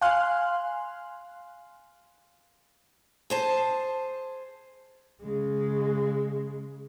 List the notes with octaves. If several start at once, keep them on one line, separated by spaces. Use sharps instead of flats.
F5 G#5 C6 F6 F#6
G#4 C5 A5
C#3 G#3